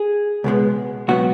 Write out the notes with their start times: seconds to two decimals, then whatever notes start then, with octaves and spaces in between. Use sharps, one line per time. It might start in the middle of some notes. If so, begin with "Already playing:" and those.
Already playing: G#4
0.44 C#2 B2 G#3 B3
1.08 C#2 B2 F#3 B3 F#4